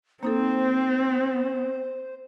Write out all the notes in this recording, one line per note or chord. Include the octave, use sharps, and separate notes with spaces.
A#3 C4 D#4 A4 C5